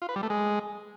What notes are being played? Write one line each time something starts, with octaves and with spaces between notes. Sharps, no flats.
F4
B4
G3
A3
G#3